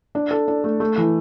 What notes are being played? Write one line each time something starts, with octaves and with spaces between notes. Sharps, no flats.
D4
A4
D4
A3
A3
E3